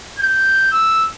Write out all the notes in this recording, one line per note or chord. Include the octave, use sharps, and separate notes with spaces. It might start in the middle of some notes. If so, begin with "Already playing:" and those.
G6
E6